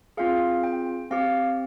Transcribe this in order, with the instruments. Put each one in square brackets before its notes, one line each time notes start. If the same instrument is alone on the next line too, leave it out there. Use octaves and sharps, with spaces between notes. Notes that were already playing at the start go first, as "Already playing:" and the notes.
[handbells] C4 F4 G#4 F5
G5
C4 G4 F5